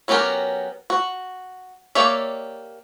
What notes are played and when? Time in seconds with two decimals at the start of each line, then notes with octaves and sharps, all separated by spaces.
0.08 F#3 B3 C#4 G4 A#4
0.90 F#4
1.95 A#3 G4 C#5 D5 E5